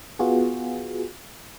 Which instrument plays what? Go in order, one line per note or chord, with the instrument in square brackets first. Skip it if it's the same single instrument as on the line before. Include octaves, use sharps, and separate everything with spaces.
[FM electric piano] B3 F4 F#4 G#4